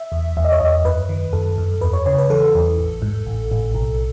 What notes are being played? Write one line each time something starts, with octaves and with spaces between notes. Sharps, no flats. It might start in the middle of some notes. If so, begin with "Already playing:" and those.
Already playing: E5
E2
E2 E5
D#5
C#5
E2 D#5
F#2 B4
D#3
F#2 A4
F#2
E2 B4
C#5
C#3 C#5
B4
E3 A4
E2
A1
G#2
A1
A1
B1